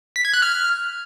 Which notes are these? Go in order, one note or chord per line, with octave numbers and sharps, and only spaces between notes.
B6
G#6
F#6
F6